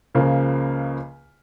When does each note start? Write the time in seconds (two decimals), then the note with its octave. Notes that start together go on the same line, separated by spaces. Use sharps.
0.15 C#2 C#3 F3 A#3